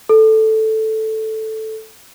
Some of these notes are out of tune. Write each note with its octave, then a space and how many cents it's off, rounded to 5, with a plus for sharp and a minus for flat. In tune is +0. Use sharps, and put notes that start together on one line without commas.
A4 +0